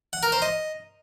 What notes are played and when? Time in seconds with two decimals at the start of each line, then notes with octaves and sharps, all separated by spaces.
0.13 F#5
0.23 A#4
0.32 C5
0.42 D#5